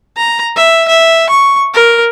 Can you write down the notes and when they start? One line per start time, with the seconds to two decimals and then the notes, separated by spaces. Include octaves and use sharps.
0.16 A#5
0.56 E5
0.88 E5
1.29 C#6
1.74 A#4